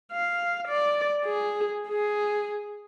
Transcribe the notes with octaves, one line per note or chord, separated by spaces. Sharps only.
F5
D5
G#4
G#4